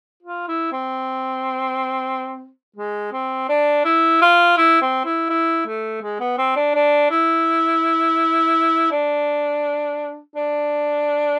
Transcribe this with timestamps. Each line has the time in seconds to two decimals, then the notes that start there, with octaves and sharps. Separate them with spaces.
0.23 F4
0.48 E4
0.72 C4
2.76 G#3
3.12 C4
3.49 D4
3.85 E4
4.22 F4
4.57 E4
4.82 C4
5.05 E4
5.29 E4
5.66 A3
6.02 G#3
6.20 B3
6.38 C4
6.56 D4
6.75 D4
7.11 E4
8.91 D4
10.36 D4